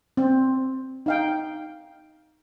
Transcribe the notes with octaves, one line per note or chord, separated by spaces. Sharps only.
C4
D#4 F5 G5